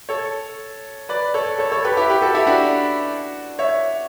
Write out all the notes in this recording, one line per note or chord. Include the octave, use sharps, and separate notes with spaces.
A4 C#5
B4 D5
A4 C#5
A4 C#5
A4 C#5
G4 B4
E4 G4
G4 B4
F#4 A4
E4 G4
D4 F#4
C#5 E5